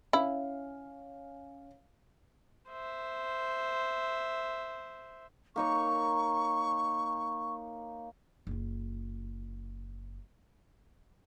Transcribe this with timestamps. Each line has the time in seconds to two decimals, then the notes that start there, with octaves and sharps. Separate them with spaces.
0.13 C#4 E4 F5
2.69 C5 E5
5.56 A#3 D#4 C#5 C#6
8.47 F#1 F4